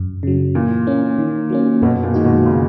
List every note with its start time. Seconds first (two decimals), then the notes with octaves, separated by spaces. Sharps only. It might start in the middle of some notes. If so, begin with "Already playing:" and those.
Already playing: F#2
0.23 C#3 F#3
0.55 A#2 E3
0.87 A#3 C#4
1.18 D#3
1.50 F#3 A#3 C#4
1.82 F#2 B2
2.03 A#2
2.14 D#3 G#3 D#4 F#4
2.25 B2
2.46 C#3